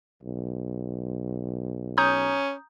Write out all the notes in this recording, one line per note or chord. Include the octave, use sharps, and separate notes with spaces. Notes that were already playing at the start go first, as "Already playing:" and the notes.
B1
C#4 A#5 D#6 G6